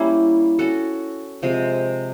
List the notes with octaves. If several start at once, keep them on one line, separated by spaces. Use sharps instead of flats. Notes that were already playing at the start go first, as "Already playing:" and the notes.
Already playing: G3 A#3 C#4 E4
C#4 F#4 A4
C3 F3 G#3